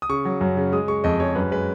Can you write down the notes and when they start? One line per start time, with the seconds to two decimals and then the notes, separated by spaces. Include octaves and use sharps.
0.02 D#6
0.09 C#3 C#6
0.25 F#3
0.41 F#2
0.57 C#3
0.72 G#3 D#6
0.88 G#3 C#6
1.04 F2 D#5
1.20 G#3 C#5
1.35 F#2 B4
1.52 G#3 B4